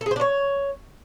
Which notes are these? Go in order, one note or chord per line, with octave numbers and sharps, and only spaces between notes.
A4
G#4
C5
D4
C#5